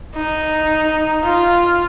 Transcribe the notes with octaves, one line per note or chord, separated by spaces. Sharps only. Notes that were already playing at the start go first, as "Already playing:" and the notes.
D#4
F4